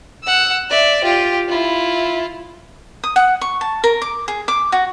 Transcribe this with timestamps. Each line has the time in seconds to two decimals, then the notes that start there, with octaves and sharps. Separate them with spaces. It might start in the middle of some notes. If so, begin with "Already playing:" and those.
0.24 F#5 E6
0.69 D5 E5
1.03 F4 G4
1.48 E4 F4
3.04 D#6
3.16 F#5
3.41 C#6
3.61 A5
3.84 A#4
4.02 D6
4.28 G#4
4.48 D6
4.72 F#4